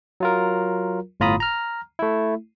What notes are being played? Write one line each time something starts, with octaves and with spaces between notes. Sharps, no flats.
F#3 F4 A#4
G1 A2 F4 A#5 B5 D#6
A#5 F6
A3 E4